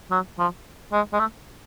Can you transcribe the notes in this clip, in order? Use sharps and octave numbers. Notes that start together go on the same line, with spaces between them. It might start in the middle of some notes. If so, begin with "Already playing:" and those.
F#3
F3
G#3
G#3
A3